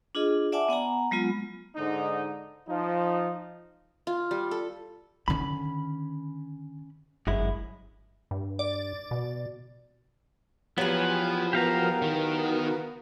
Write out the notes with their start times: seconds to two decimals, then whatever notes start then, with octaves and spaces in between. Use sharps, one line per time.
0.15 D4 F4 G#4 D#5
0.52 D5 E5 F#5 G#5 A5 D6
0.69 B3 F#5 G#5 A#5
1.11 F#3 G#3 B3 F4
1.76 G#2 D3 D#4
2.67 F3 D#4
4.07 F4
4.31 G3
4.51 A4
5.28 D3 D#3 C#4 B5
7.27 G1 F#2 G#3 E4
8.31 G2
8.59 D5
9.11 B2
10.78 E2 F3 F#3 B3 G4 B4 G#5
11.53 B3 F#4 G4 A#4 F5 A#5
12.02 D#3